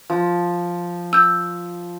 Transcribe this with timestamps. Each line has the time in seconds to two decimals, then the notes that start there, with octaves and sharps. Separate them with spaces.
0.10 F3
1.13 E6 G6